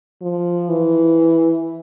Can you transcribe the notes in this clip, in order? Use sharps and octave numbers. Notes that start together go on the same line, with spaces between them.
F3
E3